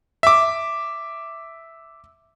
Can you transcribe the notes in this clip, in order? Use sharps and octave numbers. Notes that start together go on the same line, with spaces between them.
E5 D6